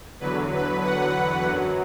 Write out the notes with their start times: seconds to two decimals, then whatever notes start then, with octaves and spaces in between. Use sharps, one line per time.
0.20 E2 D3 F#3 B4
0.52 B4
0.83 F#5
1.46 F#2 F#3